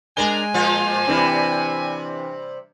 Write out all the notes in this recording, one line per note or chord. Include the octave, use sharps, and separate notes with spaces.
G#3 D4 A#4 G#5 G7
A#2 F3 F4
C3 E3 G3 C4 D4